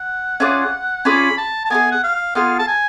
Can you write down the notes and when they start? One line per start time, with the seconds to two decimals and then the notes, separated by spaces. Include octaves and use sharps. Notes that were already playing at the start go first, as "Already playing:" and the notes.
Already playing: F#5
0.40 C#4 F4 G#4 D5
1.05 C#4 F4 G#4 D5 B5
1.38 A5
1.65 A5
1.70 B3 F4 G#4 G#5
1.92 F#5
2.03 F5
2.35 B3 F4 G#4 F5
2.59 A5
2.68 G#5